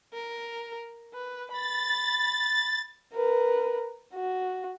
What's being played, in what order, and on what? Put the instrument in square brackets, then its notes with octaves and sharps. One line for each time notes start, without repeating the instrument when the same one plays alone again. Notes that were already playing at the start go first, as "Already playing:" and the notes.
[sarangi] A#4
B4
[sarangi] B5 [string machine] A6
[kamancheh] A#4 B4
F#4